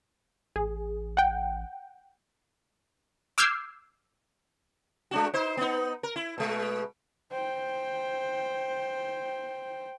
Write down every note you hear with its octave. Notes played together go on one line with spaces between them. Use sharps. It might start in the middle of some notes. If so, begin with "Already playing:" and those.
A1 G#4
F#5 G5
D6 E6 F6 G6 G#6 C7
G#3 D4 F#4
D#4 C5
B3 D#4
A#4
E4
B2 G#3
C5 G5